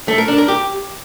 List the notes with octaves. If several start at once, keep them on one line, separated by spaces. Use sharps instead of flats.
A3
A#4
D4
A#4
G4